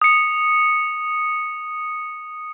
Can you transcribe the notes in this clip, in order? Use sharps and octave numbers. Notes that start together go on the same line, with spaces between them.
D#6 C#7